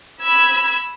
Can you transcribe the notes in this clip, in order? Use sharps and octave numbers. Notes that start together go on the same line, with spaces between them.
B5 E6 G#6